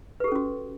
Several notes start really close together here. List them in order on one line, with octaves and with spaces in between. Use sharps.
B4 G4 A4 C#4 F#4